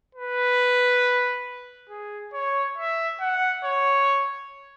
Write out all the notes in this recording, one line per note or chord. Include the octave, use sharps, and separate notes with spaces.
B4
G#4
C#5
E5
F#5
C#5